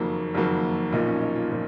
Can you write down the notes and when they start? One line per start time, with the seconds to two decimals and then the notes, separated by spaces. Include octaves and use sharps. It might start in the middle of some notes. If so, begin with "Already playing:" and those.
Already playing: F#1 F2 D#3 F#3 A#3 F#4
0.34 F#1 F2 D#3 F#3 A#3
0.92 B1 A#2 F3 A#3 D#4
1.07 C#4
1.22 D#4
1.35 F4
1.51 A#2 F3 A#3